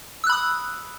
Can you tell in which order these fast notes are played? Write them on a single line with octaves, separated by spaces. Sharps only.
E6 F#6 B5 D#6